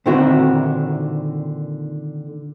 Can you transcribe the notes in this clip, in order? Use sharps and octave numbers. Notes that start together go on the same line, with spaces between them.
A#2 D3 D#3 C4 E4 F#4